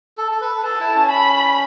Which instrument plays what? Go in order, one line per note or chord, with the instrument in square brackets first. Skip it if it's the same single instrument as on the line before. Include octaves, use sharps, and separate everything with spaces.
[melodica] A4
A4
B4
[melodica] A4 [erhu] A5
[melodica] E4
C#4
[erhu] B5